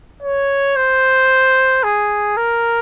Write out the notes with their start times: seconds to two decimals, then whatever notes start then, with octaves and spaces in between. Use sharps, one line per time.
0.22 C#5
0.76 C5
1.83 G#4
2.37 A#4